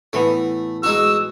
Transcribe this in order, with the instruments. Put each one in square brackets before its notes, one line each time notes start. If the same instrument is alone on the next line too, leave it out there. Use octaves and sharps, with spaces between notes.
[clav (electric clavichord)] A2 E3 B3 [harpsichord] A3
[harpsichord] G#3 D#4 F#4 [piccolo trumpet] E6